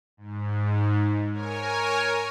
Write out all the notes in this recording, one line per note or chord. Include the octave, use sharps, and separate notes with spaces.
G#2
A#4 C#5 G#5